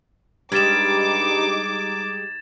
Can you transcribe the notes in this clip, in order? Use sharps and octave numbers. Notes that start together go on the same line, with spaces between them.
G2 G3 G#3 D#4 D6 G#6 A6 E7